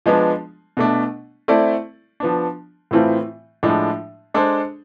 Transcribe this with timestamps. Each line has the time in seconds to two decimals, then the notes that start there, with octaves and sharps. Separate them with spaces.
0.06 F3 G#3 B3 D4
0.77 B2 A3 D4
1.48 A3 C4 E4 A4 D5
2.20 F3 B3 D4
2.91 A2 E3 A3 C4 F4
3.63 A2 F3 G#3 D4
4.34 G#3 D4 A4 C5